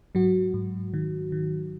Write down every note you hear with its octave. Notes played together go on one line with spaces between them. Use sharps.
G#2 F#3 F#4
G#2
D#3
D#3